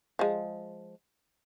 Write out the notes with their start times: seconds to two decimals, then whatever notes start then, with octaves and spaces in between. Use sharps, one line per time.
0.19 F3 G#3